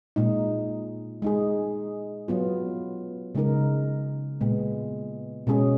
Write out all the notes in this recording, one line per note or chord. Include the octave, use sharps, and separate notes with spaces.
A#2 G#3 D#4
G#3 D#4 G#4
F#3 B3 F4
C#3 G#3 D#4 A#4
A#2 G#3 B3
B2 G#3 C#4 G#4